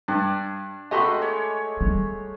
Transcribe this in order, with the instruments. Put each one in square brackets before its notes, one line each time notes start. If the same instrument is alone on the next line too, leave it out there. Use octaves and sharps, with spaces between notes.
[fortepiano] G2 [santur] D4
[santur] G#3 A3 B5 [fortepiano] F#4 G4 D#5
[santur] C#5
[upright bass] G3